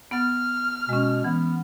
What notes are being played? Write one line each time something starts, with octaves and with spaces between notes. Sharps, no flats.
B3 F#5 F6 A6
B2 G#3 C#4
E3 B3